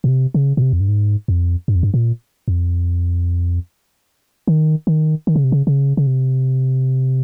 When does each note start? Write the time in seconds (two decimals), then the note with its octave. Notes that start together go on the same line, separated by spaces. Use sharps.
0.04 A#2
0.08 C3
0.34 C#3
0.57 A#2
0.62 C3
0.73 F2
0.81 G2
0.88 G#2
1.28 F2
1.68 G2
1.75 F2
1.83 G2
1.94 A#2
2.48 F2
4.48 D#3
4.87 D#3
5.27 D#3
5.36 C#3
5.44 C3
5.52 C#3
5.67 C#3
5.97 C#3
6.07 C3